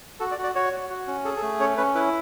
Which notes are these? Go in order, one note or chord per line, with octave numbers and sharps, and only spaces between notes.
F#4 A4
D5
F#4
D5
F#4 C#5
F#4
F#4
C#4
G#4 A4
A4
A3
C#4 C#5
C#4 B4
E4 B4